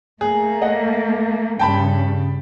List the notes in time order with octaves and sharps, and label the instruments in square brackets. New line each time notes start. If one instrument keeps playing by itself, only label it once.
[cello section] A3 A#3 [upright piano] G#4
[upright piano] D#5 F#5
[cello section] G2 C#3 [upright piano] G5 A5 B5